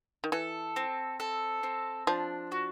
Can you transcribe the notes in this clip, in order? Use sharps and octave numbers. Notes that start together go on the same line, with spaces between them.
D#3
E3 A4
C4
A4
C4
F3 D4
F#4